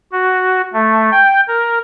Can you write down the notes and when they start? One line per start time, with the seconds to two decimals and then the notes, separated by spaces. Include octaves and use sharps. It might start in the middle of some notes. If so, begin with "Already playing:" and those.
0.12 F#4
0.73 A3
1.12 G5
1.48 A#4